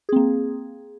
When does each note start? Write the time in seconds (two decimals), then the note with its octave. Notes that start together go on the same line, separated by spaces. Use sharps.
0.09 G#4
0.12 C4
0.16 A#3